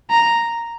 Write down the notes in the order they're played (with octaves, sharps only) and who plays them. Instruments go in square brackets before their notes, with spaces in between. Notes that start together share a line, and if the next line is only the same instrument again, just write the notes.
[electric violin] A#5